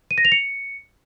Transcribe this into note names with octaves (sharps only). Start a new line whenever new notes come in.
D#7
A#6
F7
C#7